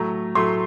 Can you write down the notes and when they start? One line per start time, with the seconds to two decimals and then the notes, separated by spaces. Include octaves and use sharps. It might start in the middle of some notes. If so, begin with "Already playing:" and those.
Already playing: A2 F#3 A3 A#5
0.35 A2 F#3 A3 C6